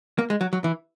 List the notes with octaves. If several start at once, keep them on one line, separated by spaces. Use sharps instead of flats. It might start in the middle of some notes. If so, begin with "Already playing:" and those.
A#3
G#3
F#3
F#3
E3